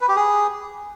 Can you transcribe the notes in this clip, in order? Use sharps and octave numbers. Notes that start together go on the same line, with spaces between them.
B4
G4
G#4